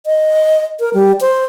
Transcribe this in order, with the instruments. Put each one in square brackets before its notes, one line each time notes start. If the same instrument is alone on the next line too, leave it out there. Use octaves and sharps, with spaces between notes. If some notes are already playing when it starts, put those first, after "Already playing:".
[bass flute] D#5
A#4
G3
C5